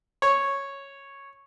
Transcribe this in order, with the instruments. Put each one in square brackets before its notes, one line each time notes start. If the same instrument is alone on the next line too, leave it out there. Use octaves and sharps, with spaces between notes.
[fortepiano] C#5